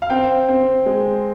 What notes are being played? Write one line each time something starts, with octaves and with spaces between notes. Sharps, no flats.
F5
C4 G5
C4
G#3